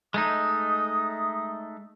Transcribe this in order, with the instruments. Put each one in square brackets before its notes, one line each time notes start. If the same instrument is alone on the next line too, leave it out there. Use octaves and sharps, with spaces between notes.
[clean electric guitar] G#3 A3 D#4 [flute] D#6